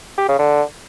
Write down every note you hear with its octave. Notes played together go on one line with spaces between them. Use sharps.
G4
C#3
D3